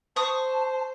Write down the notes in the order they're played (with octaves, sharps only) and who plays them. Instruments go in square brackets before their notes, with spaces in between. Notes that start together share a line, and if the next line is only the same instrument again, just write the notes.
[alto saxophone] C5 [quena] A5 [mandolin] C#6 D#6